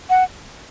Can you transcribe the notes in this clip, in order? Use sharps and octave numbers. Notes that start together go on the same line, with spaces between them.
F#5